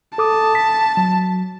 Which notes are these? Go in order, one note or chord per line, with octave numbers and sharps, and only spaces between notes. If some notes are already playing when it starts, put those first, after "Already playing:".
A4 A5 D6 D#6
B6
F#3